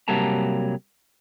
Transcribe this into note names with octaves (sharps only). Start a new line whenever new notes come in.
C3 F#3 G3 A#3 A5 A#5